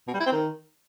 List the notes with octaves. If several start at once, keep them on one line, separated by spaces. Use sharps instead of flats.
B2
G3
E4
C4
D#3